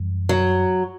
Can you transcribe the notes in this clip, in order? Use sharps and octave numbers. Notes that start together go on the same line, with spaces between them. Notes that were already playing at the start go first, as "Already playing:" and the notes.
Already playing: F#2 E3 G3
F#3